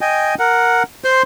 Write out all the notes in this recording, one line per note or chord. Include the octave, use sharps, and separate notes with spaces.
D#5 G5 G#5
A#4 F#5
C5 C6